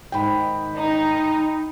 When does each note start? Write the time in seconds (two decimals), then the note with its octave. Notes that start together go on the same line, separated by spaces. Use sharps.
0.12 G#2 D#3 G5 B5
0.76 D#4